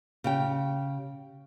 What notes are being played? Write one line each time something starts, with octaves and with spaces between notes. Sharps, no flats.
C#3 G4 G5